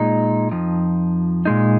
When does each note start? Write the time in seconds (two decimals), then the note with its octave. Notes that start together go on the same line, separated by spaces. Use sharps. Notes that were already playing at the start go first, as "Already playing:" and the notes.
Already playing: A#2 G#3 D#4
0.52 F2 F3 D#4
1.45 A#2 G#3 D#4